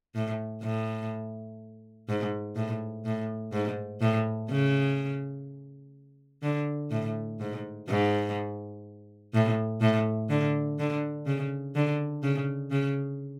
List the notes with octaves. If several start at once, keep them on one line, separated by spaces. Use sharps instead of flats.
A2
A2
G#2
A2
A2
G#2
A2
C#3
D3
A2
G#2
G#2
A2
A2
D3
D3
C#3
D3
C#3
C#3